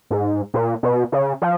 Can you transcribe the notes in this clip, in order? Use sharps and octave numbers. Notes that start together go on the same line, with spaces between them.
G#2
A#2
B2
C#3
F3